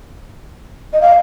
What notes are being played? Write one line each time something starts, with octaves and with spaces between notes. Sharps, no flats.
D#5
F5